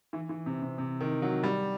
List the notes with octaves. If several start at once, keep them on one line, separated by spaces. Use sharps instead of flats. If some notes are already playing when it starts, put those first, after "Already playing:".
E3
E3
C3
C3
C3
D#3
F#3
G3